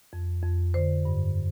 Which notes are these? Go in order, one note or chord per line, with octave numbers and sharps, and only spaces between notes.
F2
F2
D3 C5
G2